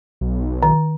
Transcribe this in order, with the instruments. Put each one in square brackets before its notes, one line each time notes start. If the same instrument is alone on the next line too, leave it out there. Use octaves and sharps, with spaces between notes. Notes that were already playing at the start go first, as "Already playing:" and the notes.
[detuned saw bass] B1
[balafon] D#3